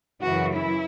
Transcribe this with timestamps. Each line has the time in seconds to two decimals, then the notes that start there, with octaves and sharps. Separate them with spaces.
0.22 F#2 C#3 E3 F#4
0.54 E4